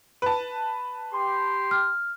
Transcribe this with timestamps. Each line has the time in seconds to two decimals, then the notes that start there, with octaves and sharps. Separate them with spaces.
0.22 B4 A5
1.12 G4 C6
1.71 F6